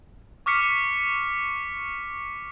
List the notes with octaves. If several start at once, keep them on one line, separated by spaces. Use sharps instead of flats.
C#6 D6 F6 B6 C#7